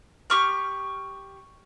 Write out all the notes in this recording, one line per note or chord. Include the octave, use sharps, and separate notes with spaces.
G4 C#6 F6